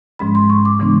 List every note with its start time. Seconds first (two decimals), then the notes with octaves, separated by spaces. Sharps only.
0.19 G#2 F3 G#3 C#4 B5
0.35 C6
0.50 C#6
0.65 D6
0.79 C#3 E3 G#3 B3 D4